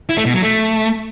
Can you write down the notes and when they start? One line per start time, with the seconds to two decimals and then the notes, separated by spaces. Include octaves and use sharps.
0.09 E4
0.18 A3
0.26 B2
0.34 F#3
0.42 A3